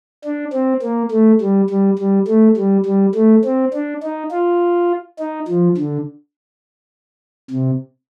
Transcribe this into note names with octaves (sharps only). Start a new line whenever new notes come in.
D4
C4
A#3
A3
G3
G3
G3
A3
G3
G3
A3
C4
D4
D#4
F4
D#4
F3
D3
C3